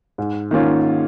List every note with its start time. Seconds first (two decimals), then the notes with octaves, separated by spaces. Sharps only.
0.18 G#2
0.51 D#3 A#3 C#4 F4